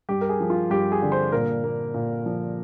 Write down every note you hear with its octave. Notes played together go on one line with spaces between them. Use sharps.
G2 G4
A#4
G#4
F3
F4
G2 G4
G#4
D3
C5
A#2 A#4
A#3
A#2
F3